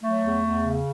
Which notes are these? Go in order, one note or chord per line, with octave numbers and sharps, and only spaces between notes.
F#3 A3
E2
E2
C#3